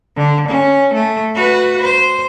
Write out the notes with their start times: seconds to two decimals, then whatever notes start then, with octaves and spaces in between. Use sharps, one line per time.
0.16 D3
0.49 C#4
0.94 A3
1.35 F#4 B4
1.82 C5